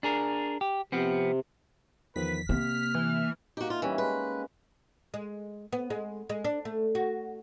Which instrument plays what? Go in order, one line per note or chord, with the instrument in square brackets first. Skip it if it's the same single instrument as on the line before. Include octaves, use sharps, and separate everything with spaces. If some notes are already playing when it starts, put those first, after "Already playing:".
[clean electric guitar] D4 G#4 A#4
G4
[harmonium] C3 [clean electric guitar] F3 B3 C4
[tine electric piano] E2 D#3 F3 [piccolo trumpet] B4 [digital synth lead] B6
[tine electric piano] C3 [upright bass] A#3 [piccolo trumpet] F6
[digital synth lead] E3
[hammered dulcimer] A#3 D#4 [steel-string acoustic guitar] F#4 G4
[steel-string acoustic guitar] F4
[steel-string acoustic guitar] E3 [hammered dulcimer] G3 C#4
[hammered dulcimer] G#3 [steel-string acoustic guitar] B4
[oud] G#3
B3
G#3
G#3
D4
A3
F#4